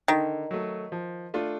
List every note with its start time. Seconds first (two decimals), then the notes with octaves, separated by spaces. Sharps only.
0.08 D3 D#3
0.51 F#3 A3
0.92 F3
1.34 A3 D4 F4